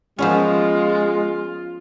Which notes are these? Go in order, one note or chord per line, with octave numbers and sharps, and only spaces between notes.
F3 G#3 B3 C#4 F4